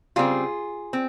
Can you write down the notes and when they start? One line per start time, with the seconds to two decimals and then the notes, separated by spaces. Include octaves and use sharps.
0.16 C#3 G3 C4 F4 G#4
0.93 C4